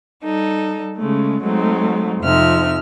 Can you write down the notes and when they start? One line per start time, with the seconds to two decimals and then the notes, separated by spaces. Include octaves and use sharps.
0.23 G3 D#4 A4
0.97 C#3 G#3 A3
1.42 F#3 G#3 A3 C4 D#4
2.21 F2 C3 F3 D#4 E5 F6